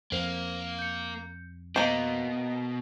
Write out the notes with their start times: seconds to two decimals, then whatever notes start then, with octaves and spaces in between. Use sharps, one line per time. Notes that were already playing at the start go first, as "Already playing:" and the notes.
0.12 F2 A#3 C5
0.79 G6 C#7
1.76 B2 A#3 C5 D#5 A#5